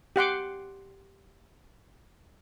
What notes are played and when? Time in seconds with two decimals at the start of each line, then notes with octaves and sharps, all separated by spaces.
0.16 G4 F#5 C6 D6